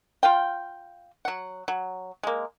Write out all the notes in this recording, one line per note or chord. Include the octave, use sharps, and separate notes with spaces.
F4 F5 G5
F#3 F#5
F#3
G#3 A#3